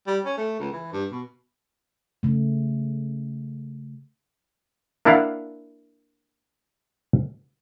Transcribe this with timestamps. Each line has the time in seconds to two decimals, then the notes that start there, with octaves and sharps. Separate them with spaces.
0.07 G3
0.25 C#4
0.37 A3
0.59 C#2
0.72 E3
0.93 G2
1.11 B2
2.23 C#3 A3
5.05 A#3 D4 E4 D5 F5 F#5